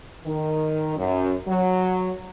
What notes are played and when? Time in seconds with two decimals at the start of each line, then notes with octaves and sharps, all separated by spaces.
0.24 D#3
0.97 F#2
1.48 F#3